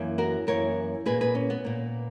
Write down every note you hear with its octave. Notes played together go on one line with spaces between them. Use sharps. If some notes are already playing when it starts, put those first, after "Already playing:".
Already playing: F#2 E3 A#3
F#4 A#4
F#2 E3 A#3 A#4 C#5
A#2 A#3 G#4 B4
G#4 B4
C#4
B3
A#2 A#3